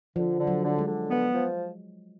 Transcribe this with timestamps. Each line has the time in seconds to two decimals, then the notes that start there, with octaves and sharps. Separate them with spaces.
0.16 D3 F3
0.39 D3
0.47 F#3
0.63 D3
0.79 G#3
0.87 D3
1.10 B3
1.34 F3